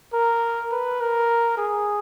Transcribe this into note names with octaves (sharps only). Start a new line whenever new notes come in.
A#4
B4
A#4
G#4